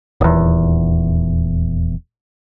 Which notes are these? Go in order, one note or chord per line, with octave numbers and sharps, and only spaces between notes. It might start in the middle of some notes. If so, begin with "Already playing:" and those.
D#1 E2